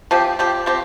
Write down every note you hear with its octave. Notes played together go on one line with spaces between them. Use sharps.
F3 C4 G4
F3 C4 G4
F3 C4 G4